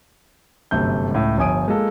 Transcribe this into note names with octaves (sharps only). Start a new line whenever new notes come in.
G1 F#2 C3 A3 G6
C#2 A2
G1 F3 C#5 G#5 D#6 D7
G#3 A#3 F4 A4